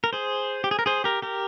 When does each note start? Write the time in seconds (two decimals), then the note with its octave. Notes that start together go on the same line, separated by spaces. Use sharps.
0.04 A#4
0.13 G#4 C5
0.64 G4
0.71 G#4
0.79 A#4
0.86 G#4 C5
1.04 G4 A#4
1.22 G4 A#4